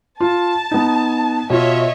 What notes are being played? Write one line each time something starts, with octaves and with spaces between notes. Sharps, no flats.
F4 A5
B3 D#4
B2 F4 C#5 D#5 E5